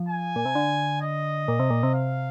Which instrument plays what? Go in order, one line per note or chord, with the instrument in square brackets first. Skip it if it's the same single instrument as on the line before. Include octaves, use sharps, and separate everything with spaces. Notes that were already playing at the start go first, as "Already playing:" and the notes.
Already playing: [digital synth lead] F3
[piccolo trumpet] G#5
[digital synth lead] A#2
C3
D3
[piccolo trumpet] D#5
[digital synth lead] A#2
C3
A#2
C3
[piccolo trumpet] F5